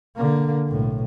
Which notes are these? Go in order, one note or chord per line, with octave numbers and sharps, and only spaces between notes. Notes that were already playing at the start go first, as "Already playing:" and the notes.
D3 A#3
B1 A2